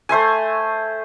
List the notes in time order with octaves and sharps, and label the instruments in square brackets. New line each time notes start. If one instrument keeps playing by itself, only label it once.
[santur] A3 C5 E5 G#5